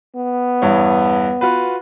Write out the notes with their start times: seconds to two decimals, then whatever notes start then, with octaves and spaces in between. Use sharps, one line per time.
0.16 B3
0.62 E2 G2 C#5
1.41 F4 F#4 B4